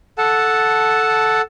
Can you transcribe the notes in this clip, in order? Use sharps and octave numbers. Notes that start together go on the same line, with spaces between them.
A4 F#5 A5